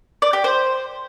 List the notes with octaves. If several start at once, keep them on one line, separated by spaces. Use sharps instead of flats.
D5
G4
C5